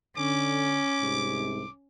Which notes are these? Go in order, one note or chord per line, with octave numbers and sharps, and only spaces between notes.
D3 C#4 D6
C2 G#2 C3